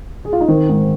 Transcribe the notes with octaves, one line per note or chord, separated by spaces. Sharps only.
G#4
F4
D#4
D#3 C4
G#2